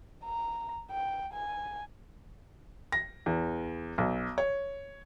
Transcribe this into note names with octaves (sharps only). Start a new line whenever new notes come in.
A#5
G5
G#5
A#6
E2
B1
C#5